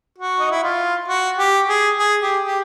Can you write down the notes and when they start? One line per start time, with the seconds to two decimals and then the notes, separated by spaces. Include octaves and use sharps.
0.18 F#4
0.40 D#4
0.51 E4
0.63 F4
1.08 F#4
1.39 G4
1.69 G#4
1.99 G#4
2.22 G4
2.44 G4